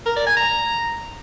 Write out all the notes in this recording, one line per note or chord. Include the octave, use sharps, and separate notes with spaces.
A#4
D5
G#5
A#5